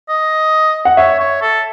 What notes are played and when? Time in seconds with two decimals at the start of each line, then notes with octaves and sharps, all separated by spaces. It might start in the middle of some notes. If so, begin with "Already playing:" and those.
0.09 D#5
0.85 F#5
0.97 C#5 E5
1.20 C#5
1.42 A4